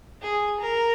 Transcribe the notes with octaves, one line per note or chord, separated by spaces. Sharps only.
G#4
A#4